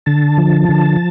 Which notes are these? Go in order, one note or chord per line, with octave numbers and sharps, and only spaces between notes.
D3 A5
F3
D3